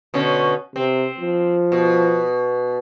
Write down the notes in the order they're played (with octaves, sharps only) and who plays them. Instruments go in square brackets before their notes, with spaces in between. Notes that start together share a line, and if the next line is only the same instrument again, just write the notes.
[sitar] B2 D3 C#4
[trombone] C3 [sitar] C4
[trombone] F3
[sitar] B2